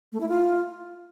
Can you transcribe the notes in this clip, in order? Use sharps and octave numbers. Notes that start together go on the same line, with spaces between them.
A3
E4
F4